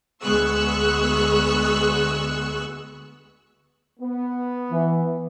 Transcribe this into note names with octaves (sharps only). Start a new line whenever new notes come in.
D2 G#3 B3 C#6 E6 F#6
B3
E3